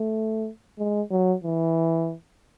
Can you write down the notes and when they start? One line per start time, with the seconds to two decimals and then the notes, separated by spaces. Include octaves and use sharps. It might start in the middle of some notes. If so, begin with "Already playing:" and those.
Already playing: A3
0.79 G#3
1.11 F#3
1.44 E3